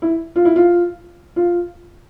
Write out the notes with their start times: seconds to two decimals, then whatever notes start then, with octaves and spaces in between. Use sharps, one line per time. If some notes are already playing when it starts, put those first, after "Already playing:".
0.02 E4
0.36 F4
0.45 E4
0.56 F4
1.36 F4